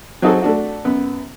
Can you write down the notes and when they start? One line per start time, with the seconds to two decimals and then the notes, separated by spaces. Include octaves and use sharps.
0.22 F#3 C4 D#4 F#4 G#4 A4
0.42 A3 D4 F#4
0.85 F#2 B3